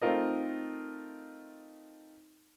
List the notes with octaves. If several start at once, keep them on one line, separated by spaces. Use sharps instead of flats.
A3 C4 D#4 F4 A#4 D#5